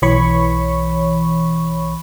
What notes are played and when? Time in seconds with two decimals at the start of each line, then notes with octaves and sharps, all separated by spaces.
0.02 B1 E3 C#5 B5 C#6